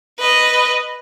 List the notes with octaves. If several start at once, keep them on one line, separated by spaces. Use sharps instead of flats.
B4 D#5